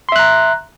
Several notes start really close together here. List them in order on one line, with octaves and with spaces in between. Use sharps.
C6 E5 F#6 A#5